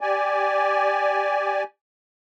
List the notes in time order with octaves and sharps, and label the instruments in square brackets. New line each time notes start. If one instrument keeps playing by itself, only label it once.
[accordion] G4 D5 G#5